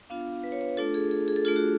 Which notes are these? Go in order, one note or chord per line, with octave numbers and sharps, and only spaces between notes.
B3 D4 F4 F5
B4
C#5
B4
A3 D4 F4 A4
G#4
G#4
G#4
A4
A3 D4 F4 G#4
F#4